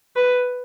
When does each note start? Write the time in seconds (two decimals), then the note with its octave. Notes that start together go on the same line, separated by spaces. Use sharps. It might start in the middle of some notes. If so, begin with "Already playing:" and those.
0.16 B4